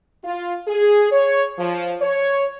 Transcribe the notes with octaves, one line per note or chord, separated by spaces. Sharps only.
F4
G#4
C#5
F3
C#5